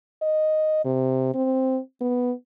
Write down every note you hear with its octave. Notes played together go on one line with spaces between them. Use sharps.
D#5
C3
C4
B3